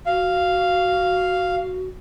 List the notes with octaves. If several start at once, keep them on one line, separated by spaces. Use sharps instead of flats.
F#4 F5